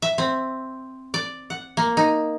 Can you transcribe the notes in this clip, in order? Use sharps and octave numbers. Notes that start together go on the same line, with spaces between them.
E5
C4
D5
F#5
A#3
D#4